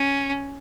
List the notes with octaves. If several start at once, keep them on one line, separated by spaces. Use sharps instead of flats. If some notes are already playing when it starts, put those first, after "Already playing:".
Already playing: C#4